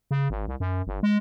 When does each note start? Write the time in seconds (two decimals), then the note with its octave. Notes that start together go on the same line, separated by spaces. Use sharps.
0.11 C#3
0.30 G#1
0.48 C2
0.60 F#2
0.87 G1
1.03 G#3